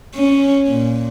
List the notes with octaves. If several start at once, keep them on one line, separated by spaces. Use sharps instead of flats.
C#4
A#2